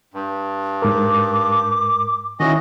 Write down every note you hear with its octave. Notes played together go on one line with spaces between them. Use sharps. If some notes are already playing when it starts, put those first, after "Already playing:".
G2
G#2 A#4 D6
D#3 C#4 E4 F#4 D#5 G#5